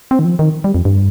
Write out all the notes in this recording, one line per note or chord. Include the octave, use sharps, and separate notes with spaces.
C4
D#3
F3
D#3
G3
F2
G2